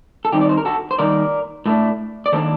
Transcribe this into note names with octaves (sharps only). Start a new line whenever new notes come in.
A4
D#3 G3 C4 D#4 G4
D5
C5
A#4
F#4 A4
C5
D#3 G3 A#3 D#4 A#4 D5
A2 A3 D4
D5
D#3 F#3 A#3 D4 A4 C5